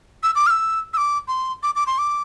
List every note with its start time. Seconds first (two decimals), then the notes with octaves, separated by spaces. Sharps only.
0.23 E6
0.35 D6
0.47 F6
0.50 E6
0.93 E6
0.97 D6
1.28 C6
1.63 D6
1.76 D6
1.87 C6
1.98 D6